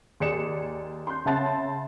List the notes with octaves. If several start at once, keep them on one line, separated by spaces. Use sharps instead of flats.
D#2 G#4 D5 C#7 E7
C6 G6
C#3 E5 F#5 A5 C6 A6